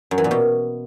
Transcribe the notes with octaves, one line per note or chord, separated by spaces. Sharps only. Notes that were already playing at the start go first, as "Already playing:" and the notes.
F#2
E3
A#2
B2